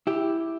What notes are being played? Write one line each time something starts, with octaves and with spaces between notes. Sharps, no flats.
E4 G4